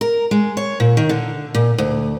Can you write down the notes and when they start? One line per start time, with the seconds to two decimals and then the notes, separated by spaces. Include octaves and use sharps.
0.01 A#4
0.31 G#3
0.57 C#5
0.80 A#2
0.97 D#3
1.09 D3
1.55 A#2
1.78 D2